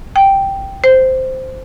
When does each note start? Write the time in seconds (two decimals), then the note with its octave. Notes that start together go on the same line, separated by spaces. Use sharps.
0.16 G5
0.84 C5